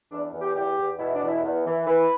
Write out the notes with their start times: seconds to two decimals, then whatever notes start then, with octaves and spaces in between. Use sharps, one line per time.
0.11 E2 D4
0.33 E2
0.41 G4
0.56 E2 G4
0.78 E2
0.99 B2 E4
1.14 D4
1.21 E2
1.28 E4
1.43 E2
1.66 E3
1.87 E3 B4